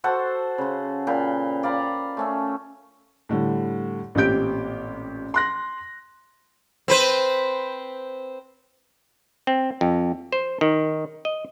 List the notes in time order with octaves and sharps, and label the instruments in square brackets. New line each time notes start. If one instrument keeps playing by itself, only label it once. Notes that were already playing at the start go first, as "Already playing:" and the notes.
[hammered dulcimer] F#4 A4 C5 F#5
C#3 C6
A#2 F5 G5 B5
D5 F5 A#5 B5
A3 C#4 A4
[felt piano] A2 D3 G3
A1 A#2 C4 G4 G6 D7
C6 F#6 A#6
[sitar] C4 B4 C5
[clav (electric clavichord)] C4
F2
C5
D#3
D#5